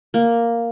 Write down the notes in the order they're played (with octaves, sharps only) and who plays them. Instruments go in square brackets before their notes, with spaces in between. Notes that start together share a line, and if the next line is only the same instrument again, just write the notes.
[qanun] A#3